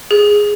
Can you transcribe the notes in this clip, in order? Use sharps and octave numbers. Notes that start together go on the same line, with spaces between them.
G#4